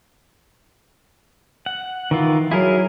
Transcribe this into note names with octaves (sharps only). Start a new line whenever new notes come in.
F#5
D#3 E3 F4
F#3 E4 G#4 A#4